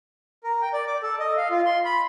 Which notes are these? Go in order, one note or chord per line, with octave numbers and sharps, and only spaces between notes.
A#4
G5
D5
D6
A4
D#5
F5
F4
C6
B5